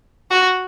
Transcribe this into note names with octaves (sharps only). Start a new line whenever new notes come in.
F#4